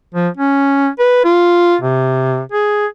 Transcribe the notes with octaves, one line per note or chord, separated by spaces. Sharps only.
F3
C#4
B4
F4
C3
G#4